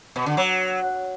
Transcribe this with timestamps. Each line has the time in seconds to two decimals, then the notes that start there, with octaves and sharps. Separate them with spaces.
0.16 B2
0.26 D3
0.37 F#3